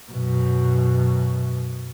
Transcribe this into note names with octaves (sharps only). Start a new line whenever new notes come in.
F#2 B2